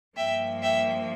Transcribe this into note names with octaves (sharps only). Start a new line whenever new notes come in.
G2 F3 A#3 E5 G5
E5 G5